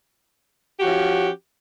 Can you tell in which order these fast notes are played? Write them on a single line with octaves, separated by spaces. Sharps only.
G4 F#4 C#4 F3